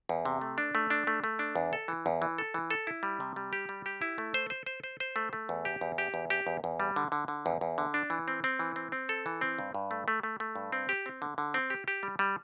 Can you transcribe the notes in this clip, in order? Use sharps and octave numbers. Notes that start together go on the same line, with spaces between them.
E2
C3
A3
D4
A3
D4
A3
A3
D4
E2
A4
E3
E2
E3
A4
E3
A4
E4
G3
C3
G3
G4
G3
G4
E4
A3
C5
C5
C5
C5
C5
A3
A3
E2
G4
E2
G4
E2
G4
E2
E2
G3
D3
D3
D3
E2
E2
D3
D4
E3
C4
C4
E3
C4
C4
A4
E3
C4
G2
G2
A3
A3
A3
A3
G2
C4
G4
C4
D3
D3
C4
G4
G4
G3
G3